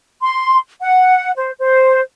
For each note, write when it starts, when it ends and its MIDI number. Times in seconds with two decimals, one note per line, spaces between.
0.22 0.58 84
0.81 1.31 78
1.36 1.52 72
1.59 2.01 72